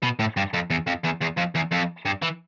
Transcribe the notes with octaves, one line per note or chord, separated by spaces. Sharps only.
B2
A2
G2
F2
E2
F2
E2
E2
F2
E2
F2
G2
E3